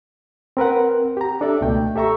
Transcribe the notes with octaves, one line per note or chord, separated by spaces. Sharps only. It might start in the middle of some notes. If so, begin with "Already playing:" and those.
C4 A#4 B4 F#5
G4 A#5
D4 A4 D5 E5
C#2 B2 A3 G5
G4 A4 E5 A#5 C#6